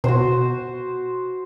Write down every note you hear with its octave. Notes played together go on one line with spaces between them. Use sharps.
B2 F#4 C5